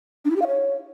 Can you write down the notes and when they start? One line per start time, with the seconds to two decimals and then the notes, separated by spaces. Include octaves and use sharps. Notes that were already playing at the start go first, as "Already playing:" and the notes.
0.25 D4
0.30 E4
0.36 G4
0.41 F5
0.47 C#5